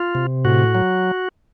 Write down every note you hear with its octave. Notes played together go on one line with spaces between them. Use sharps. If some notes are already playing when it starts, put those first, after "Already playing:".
Already playing: F4
C3
A2 F#4
F#3